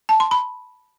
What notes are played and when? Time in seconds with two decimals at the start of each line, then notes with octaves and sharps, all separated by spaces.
0.09 A5
0.20 C6
0.31 B5